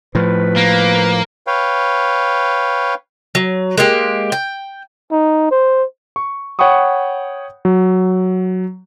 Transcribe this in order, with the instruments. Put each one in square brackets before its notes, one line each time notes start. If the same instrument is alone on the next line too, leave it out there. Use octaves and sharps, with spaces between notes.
[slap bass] A2 F3 [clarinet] B4
[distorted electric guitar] A#3
[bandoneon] B4 C#5 F5 G5
[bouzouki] F#3
G#3 A#3 G4
G5
[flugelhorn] D#4
C5
[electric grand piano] C#6
C#5 F#5 G5 B5 C#6 D#6
F#3